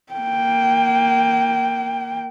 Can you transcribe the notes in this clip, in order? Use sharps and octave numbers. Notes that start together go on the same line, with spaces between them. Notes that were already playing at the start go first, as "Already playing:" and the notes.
A#3 G5